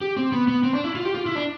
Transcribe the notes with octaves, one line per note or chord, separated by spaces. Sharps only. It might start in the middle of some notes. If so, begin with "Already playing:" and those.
G4
C4
B3
B3
C4
D4
E4
F4
G4
F4
E4
D4